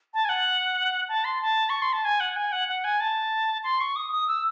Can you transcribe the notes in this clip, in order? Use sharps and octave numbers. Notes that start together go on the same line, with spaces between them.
A5
G#5
F#5
A5
C6
A5
C#6
C6
A5
G#5
F#5
G#5
F#5
F#5
G#5
A5
C6
C#6
D#6
D#6
E6